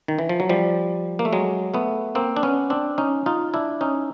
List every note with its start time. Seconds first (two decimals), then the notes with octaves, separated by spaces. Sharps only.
0.08 D#3
0.19 E3
0.29 F3
0.40 F#3
0.49 F3 G3
1.19 A#3
1.25 A3
1.33 F#3 G#3
1.74 A3 B3
2.15 A#3 C4
2.37 D4
2.43 B3 C#4
2.70 C4 D4
2.98 C#4 D#4
3.26 D#4 F4
3.54 D4 E4
3.81 C#4 D#4